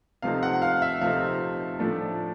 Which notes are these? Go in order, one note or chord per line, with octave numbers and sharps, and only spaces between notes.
C3 F3 A3 C4 D#4 F5
F#5
F5
E5
C3 F3 A3 C4 D#4 F5
A2 F3 A3 D4